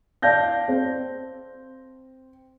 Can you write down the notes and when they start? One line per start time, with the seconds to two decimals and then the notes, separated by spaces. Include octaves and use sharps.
0.22 D5 F5 A5 G6 A#6
0.68 C4